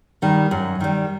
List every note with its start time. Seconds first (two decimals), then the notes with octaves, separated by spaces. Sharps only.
0.22 D#3 G3
0.51 F#2
0.80 D#3 G3